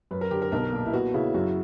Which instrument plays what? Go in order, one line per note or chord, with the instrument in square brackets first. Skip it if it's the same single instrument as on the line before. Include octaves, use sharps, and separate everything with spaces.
[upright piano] F#2 [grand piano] B4
[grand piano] A#4
[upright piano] D3 [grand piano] G4
[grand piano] A#4
[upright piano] B1 [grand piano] A#4
[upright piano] A#2
[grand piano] E4
[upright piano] B3 [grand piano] F#4
[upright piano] C#3 [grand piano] E4
[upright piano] F#2 [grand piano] F#4